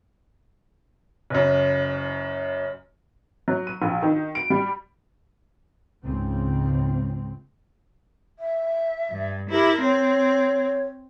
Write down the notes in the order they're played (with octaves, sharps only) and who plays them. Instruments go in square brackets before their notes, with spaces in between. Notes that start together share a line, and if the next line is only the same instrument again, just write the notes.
[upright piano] F#1 F#2
[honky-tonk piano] F#3
D#7
A#1
D#3
D7
G3
[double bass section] C#2 G#2 C#3 C4
[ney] E5
[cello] G2
[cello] E4 A#4 [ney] G4
[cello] C4 [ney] C#5